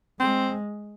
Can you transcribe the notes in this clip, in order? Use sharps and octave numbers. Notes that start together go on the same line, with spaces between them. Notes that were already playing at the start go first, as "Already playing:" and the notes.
G#3 C4